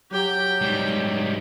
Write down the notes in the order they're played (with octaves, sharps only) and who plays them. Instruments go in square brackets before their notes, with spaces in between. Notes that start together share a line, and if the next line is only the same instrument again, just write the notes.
[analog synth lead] F#3 [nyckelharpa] G4 G5
[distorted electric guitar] G#2 G3